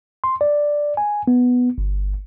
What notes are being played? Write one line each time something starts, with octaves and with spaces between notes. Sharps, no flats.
C6
D5
G#5
B3
G1